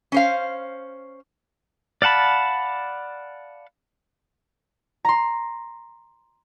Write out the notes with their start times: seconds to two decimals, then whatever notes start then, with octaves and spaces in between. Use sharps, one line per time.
0.12 C#4 C5 F5
2.02 D5 F5 F#5 A5 B5
5.05 A#5 C6